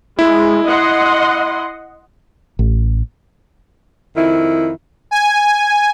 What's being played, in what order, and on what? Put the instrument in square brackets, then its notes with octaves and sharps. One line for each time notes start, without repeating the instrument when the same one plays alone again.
[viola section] G#3 [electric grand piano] E4
[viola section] D#5 F#5 C6
[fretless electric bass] A1
[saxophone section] F2 D#3 E4
[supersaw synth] G#5